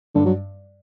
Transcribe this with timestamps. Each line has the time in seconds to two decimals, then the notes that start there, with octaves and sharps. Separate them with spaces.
0.15 G2 D3
0.25 F#3